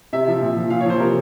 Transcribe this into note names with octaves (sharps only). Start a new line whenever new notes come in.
C3 E5
F3
A#2
F3
A#2 F5
C#5
F3 C5
C3 A#4